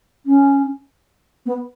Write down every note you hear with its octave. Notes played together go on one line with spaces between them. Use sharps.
C#4
B3